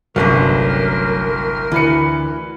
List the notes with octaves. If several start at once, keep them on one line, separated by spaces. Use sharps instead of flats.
G1 C2 F#3 A3 C#4 A#4
D2 E3 B4 C#7